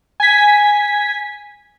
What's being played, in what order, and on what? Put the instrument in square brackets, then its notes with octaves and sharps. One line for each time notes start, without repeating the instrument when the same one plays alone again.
[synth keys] G#5 G#6 B6